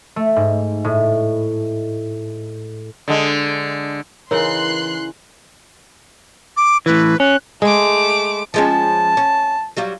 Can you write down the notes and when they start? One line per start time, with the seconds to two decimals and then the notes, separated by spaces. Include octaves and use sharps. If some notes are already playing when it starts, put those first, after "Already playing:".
0.16 A3
0.36 G#2
0.84 A2
3.08 D3 G#3
4.31 C#3 E3 D#4 A#4 C#5 C6 F#6 C7
6.57 D6
6.86 A2 E3 B4
7.20 C#4 F#6
7.62 G#3 A3 D6
8.54 F3 G#3 C#4 A5
9.17 C#4
9.77 F#3 G3 F4